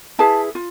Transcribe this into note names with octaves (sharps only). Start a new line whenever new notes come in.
E4 G#4 B4 A5
F4